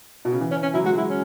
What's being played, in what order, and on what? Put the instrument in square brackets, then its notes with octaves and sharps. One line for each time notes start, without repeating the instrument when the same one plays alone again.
[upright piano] B2
C#3
E3
[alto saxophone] C#4
C#4
[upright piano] F#3 [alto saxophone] E4
[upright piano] G#3 [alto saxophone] F#4
[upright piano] F#3 [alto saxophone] E4
[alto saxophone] C#4